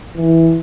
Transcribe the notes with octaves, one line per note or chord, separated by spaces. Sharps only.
E3